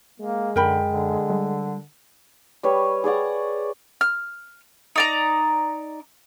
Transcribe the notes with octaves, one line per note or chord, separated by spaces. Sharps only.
G#3 A#3
F#2 D3 A#4 G5 B5
D3
G3
G3 B4 C#5
G#4 C#5 D5 F#5
F6
D#4 D5 A#5